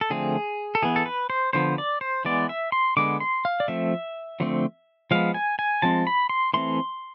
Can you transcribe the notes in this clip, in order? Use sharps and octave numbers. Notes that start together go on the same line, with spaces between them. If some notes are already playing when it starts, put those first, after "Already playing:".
A4
D3 F3 A3 C4 G#4
A4
E3 B3 G#4
A4
B4
C5
D3 F3 B3 C5
D5
C5
E3 G#3 B3 D5
E5
C6
D3 G#3 B3 D6
C6
F5
D5
F3 A3 C4 E5
D3 F3 A3 C4
F3 G#3 B3 F5
G#5
G#5
F3 G#3 C4 A5
B5
C6
E3 A3 C4 C6